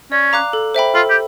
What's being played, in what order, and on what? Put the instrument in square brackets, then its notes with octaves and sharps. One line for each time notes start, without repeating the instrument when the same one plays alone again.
[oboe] C#4 [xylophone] D5
[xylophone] F5 A#5 D6 F#6
A4
C5 E5 G5 B5
[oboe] F4 [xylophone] A4
[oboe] G4